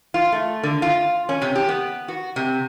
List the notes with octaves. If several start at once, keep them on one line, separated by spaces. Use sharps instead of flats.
F4
A3
D3
F4
C#4
C3
G4
B3
F#4
C3